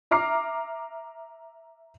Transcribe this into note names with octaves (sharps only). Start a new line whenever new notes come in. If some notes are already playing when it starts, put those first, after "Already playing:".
E5 A#5 D6 F6 C7